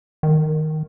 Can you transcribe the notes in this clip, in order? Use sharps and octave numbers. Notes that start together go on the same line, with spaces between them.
D#3